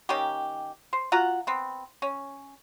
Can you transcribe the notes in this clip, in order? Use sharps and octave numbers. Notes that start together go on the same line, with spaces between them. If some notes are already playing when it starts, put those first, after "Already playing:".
D#3 A#3 C#4 G4
C5
F4 F#4 F#5 A#5
B3 C4
C#4